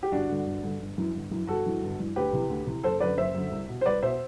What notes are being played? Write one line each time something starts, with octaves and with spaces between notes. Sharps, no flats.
G4
G1 D4 F#4
G2 D3
G1
G2 D3
G1
F#2 E3
G1
F#2 E3
G1 F#4 A4
G2 E3
G1
G2 E3
D2 G4 B4
C3 E3
D2
C3 E3
F#1 A4 C5
F#2 D3 B4 D5
F#1 C5 E5
F#2 D3
C2
B2
C5
C2 B4 D5
B2 C5 E5